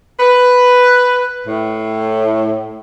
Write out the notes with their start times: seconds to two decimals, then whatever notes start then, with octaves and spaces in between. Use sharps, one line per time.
0.20 B4
1.47 A2